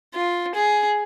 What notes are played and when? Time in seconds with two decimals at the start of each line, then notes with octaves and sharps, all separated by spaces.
0.15 F4
0.55 G#4